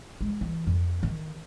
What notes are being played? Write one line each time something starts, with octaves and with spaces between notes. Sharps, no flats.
G#3
E3
F2
D#3